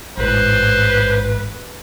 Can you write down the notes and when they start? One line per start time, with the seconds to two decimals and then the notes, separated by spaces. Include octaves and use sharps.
0.17 A1 G#2 B4 C5